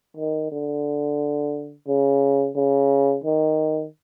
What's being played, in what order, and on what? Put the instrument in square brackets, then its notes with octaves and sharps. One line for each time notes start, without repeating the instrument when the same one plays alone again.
[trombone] D#3
D3
C#3
C#3
D#3